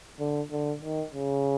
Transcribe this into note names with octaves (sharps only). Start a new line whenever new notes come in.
D3
D3
D#3
C#3